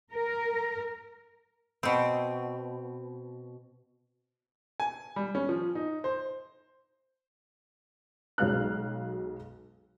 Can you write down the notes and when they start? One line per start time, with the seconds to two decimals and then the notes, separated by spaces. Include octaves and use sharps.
0.12 A#4
1.83 B2 C4
4.80 G#5
5.16 G3
5.35 C#4
5.49 F3
5.75 D#4
6.04 C5
8.38 B1 F#3 G#3 F5 F6 F#6